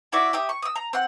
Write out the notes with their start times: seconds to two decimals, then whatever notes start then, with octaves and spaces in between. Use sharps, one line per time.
0.12 E4 F#4 D5 E5
0.33 G4 E5 D#6
0.49 C#6
0.62 D#6 E6
0.76 A#5
0.93 C4 F#5